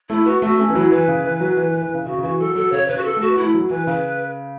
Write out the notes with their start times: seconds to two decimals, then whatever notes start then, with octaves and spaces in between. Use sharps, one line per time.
0.09 A3 E4
0.26 B3 F#4
0.42 A3 F#4
0.59 A3 C#4
0.69 E3
0.75 F#3 E4
0.91 E3 B4
1.08 C#3
1.24 E3
1.40 F#3
1.57 E3
1.69 E3
1.82 E3
1.94 C#3
2.06 C#3 F#4
2.18 C#3
2.23 E3 F#4
2.39 F#3 A4
2.55 F#3 A4
2.72 C#3 C#5
2.88 C#3 B4
2.98 F#4
3.04 B3 A4
3.17 A3 F#4
3.30 B3
3.38 A3 E4
3.54 F#3
3.70 E3 B4
3.87 C#3 B4